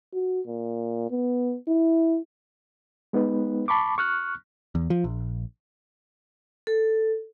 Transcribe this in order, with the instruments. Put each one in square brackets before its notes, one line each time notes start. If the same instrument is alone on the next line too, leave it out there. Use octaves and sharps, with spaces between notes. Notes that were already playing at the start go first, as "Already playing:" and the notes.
[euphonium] F#4
A#2
B3
E4
[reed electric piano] G#3 B3 D#4 B4
A5 B5 C#6 D6
C#6 F6 F#6
[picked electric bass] E2
F3
A#1
[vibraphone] A4